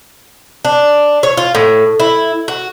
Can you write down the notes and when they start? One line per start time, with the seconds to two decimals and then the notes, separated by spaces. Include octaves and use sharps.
0.65 D4
1.23 C#5
1.37 F4
1.55 A2
2.00 E4
2.48 F#4